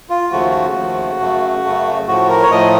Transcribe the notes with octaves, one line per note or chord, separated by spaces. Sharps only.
F4
D#2 C#3 F3 A3 F#4
D#2 C#3 F3 A3
F#2 C#3 A3
F#2 C#3 A3
A2 F3 A3 F#4
A#4
C#5
A2 F3 A3 D#5